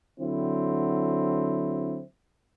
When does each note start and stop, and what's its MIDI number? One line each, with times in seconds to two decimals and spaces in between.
0.20 2.00 50
0.20 2.00 54
0.20 2.00 60
0.20 2.00 64